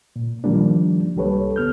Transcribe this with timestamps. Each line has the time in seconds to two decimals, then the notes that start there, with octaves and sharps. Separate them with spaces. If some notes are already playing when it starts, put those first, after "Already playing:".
0.16 A#2
0.44 D#3 F3 G3 A#3 D4
1.16 C2 G3 G4 A4 B4 C#5
1.56 D2 B3 F6 G6